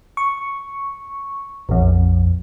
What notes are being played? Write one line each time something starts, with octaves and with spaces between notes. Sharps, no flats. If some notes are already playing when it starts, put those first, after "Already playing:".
C#6
A#1 F2